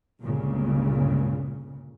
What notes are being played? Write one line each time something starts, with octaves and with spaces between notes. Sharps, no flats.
G1 C#2 A#2 C#3